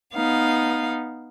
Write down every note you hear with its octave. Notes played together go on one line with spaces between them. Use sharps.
B3 D#4 F5